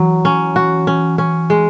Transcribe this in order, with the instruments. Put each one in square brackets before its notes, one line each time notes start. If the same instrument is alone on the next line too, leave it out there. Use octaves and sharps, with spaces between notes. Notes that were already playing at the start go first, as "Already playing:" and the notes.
Already playing: [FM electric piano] E3 [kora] F#3
[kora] C#4
F#4
C#4
C#4
G#3